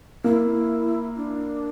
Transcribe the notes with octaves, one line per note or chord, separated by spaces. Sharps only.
A#3 E4
D4